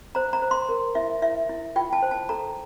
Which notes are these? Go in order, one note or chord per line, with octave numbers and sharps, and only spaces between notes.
C5 A#5
A#5
C5
C6
A#4
E4 E5
E4 E5
E4
F4 G5
A5
C5
A5
A4 A#5